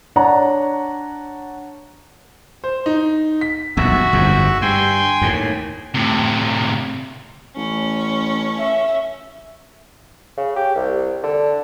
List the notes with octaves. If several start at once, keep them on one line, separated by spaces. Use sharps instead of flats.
D4 C#5 F#5 A5 A#5
C5
D#4
B6
D#1 B1 F2 F#4 E5
G1 F2 G#2
G2 G5 G#5 C6
D#2 A2
A2 C3
A1 C#4
E5
C#3
G4
C2
D3